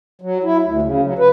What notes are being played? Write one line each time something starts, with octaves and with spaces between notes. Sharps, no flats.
F#3
E4
D2
C#3
F#3
B4